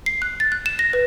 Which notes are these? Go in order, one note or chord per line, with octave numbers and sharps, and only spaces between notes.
C7
F#6
A6
F#6
E7
A#6
B4